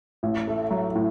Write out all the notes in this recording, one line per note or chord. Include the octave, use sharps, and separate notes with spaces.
A1
A3
F#3
A2